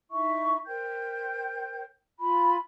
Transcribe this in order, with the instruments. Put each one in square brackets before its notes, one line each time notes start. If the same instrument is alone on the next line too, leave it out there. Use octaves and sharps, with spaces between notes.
[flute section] D#4 E4 E5 C#6
A#4 C5 G5 G6
F4 B5